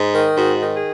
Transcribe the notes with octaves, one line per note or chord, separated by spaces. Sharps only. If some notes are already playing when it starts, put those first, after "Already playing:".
Already playing: G#2
D#3
G#2 F#4
D#3
G#4